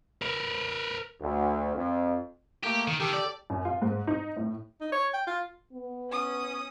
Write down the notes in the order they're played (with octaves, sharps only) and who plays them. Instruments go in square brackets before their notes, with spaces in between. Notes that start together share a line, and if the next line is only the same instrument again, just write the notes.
[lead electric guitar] A#4 B4
[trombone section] D2
F2
[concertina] A3 A#3 [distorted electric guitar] G4
[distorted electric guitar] D#3
[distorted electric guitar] D#3 [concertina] G4 A4
[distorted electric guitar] D5
[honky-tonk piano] F#2
F4
G#2
D#4
A2
[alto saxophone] D#4
C#5
G5
F4
[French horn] B3
[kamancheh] C#4 D#6